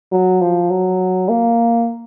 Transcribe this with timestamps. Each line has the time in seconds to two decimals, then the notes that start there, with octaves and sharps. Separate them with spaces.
0.12 F#3
0.41 F3
0.70 F#3
1.29 A#3